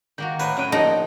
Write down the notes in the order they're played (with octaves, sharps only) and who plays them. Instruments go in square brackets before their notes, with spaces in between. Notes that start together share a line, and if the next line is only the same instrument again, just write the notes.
[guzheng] D#3 A#3 F#4 [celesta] G6
[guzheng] A2 D#4 G#5 [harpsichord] B4
[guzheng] F#2 G5 [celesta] F#6 D#7
[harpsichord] A#1 [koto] D#4 [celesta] D#5 A5 [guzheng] F#5 G5 C6